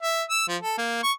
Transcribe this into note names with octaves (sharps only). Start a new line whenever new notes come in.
E5
E6
F3
A4
A#3
C#6